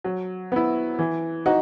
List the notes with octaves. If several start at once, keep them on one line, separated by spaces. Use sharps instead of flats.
F#3
B3 E4
E3
D#4 F#4